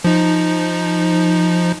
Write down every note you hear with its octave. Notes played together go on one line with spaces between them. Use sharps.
F3 D#4